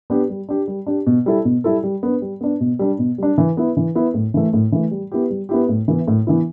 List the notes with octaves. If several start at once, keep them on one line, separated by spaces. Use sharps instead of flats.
B3 D4 G4
G3
D4 G4
G3
D4 G4
B2
G3 E4 A4
B2
G3 E4 A4
G3
B3 D4
G3
B3 D4
B2
G3 D4
B2
G3 D4
E3
B3 E4
E3
B3 E4
A2
E3 A3
A2
E3 A3
G3
B3 E4 G4
G3
B3 E4 G4
A2
E3 B3 E4
A2
E3 B3 E4